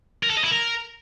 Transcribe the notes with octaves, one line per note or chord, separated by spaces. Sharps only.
A#4
A4
D#5
E4
A#4